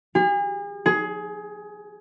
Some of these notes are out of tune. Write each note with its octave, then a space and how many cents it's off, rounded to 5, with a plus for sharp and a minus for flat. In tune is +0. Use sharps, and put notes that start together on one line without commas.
G#4 -40
G#4 +20